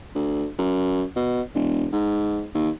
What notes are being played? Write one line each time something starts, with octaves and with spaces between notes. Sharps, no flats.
D2
F#2
B2
E1
G#2
D#2